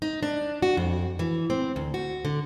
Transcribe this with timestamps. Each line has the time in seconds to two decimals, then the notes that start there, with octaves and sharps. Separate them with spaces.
0.02 D#4
0.23 D4
0.62 F#4
0.77 F2
1.19 E3
1.50 C4
1.76 D2
1.94 F#4
2.25 D3